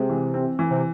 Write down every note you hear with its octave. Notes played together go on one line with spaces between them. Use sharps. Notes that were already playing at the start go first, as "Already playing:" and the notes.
Already playing: C3 G#3
E3
C4
E3
C3